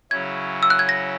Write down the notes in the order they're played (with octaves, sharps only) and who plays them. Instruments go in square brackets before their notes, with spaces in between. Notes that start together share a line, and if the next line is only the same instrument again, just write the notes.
[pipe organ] C#3 F#3 C#4 E4 [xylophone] G#6
[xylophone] E6
F#6
G#6
A#6